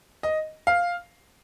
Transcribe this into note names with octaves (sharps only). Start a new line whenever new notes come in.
D#5
F5